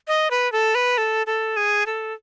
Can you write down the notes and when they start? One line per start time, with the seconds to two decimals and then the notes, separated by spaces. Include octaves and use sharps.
0.08 D#5
0.31 B4
0.52 A4
0.75 B4
0.98 A4
1.27 A4
1.57 G#4
1.86 A4